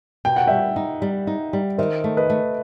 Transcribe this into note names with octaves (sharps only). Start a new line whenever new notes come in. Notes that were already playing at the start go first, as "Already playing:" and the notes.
B2 G5
F#5
G3 E5 G5
D#4
G3
D#4
G3
D#3 C5 E5
A3
B4 D#5
A3